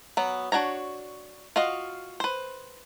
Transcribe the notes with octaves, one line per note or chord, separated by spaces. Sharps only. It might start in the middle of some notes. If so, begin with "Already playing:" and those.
F#3 B3
D4 F#4 C#5 A#5
F4 F#4 D#5 F5
B4 C5